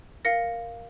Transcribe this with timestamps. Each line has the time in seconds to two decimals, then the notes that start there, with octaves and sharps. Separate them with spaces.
0.25 A#4 F5 A#6 C#7